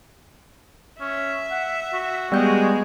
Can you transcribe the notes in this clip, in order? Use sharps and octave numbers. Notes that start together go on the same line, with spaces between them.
C#4 E5
F#5
F#4
G3 G#3 B3 G6